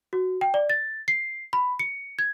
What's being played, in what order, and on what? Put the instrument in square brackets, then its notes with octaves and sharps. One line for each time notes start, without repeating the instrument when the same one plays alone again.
[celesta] F#4
G5
D5
A6
C7
B5
C#7
G#6